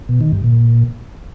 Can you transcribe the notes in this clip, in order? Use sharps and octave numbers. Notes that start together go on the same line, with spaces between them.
B2
D#3
G2
A#2